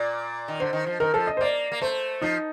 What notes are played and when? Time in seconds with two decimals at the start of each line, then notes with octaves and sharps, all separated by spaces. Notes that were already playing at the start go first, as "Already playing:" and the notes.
Already playing: A#2 D5
0.48 D#3
0.60 D3 C5
0.73 D#3
0.86 F3
1.00 D#3 A#4
1.14 F3 A4
1.27 D#5
1.37 C5
1.41 A#3 D5
1.72 A#3
1.82 A3 C5
2.22 F3 D#4